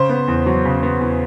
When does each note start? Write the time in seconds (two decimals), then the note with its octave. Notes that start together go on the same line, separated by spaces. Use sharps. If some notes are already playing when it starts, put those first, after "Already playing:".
Already playing: C#3 C5
0.09 B3
0.28 E2
0.46 F#3
0.65 C#3
0.83 B3
1.01 E2